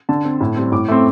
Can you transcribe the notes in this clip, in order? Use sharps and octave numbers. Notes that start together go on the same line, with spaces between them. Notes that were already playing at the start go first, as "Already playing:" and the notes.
D3 A5
C4
A2
G3 C4
A2 D6
A3 C4